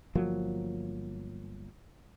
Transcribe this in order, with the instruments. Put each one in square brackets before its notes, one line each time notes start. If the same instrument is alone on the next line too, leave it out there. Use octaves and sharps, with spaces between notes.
[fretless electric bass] G1 F3 F#3 A#3